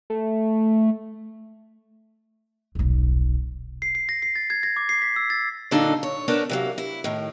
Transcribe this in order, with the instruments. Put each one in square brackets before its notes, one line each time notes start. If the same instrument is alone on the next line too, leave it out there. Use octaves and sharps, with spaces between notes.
[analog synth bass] A3
[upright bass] D#1 B1
[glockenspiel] C7
C7
A#6
C7
A6
G#6
A#6
D6
C7
B6
E6
A6
[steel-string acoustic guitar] A#2 D3 F#3 D4 D#4 A4
C#5
A3 B3 D4 A4 A#4 C#5
C3 F#3 A#3
E4
A2 D#3